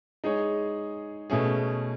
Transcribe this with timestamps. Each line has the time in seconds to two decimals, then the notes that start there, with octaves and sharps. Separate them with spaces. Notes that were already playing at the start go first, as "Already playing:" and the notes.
0.24 G#3 D#4 G#4 C#5
1.30 B2 A3 C#4 G#4